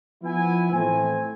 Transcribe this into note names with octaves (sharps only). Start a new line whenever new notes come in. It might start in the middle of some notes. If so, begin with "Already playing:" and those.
F3 B3 E4 G#5
A2 E3 A3 C4 G#5